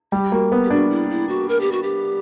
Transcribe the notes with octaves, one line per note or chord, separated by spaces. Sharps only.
G3 G4
A#3 F#4
B3
G4
D4 F#4
E4
E4
F#4
A#4
G4
F#4
G4